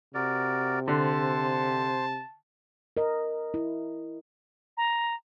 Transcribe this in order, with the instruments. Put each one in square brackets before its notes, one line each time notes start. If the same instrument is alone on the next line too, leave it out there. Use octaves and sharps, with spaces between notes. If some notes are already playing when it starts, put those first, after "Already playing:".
[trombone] C3 [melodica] F#4 A#4 D5
[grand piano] D3 [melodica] C5 [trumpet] A5
[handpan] A#4 D#5
E4
[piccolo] A#5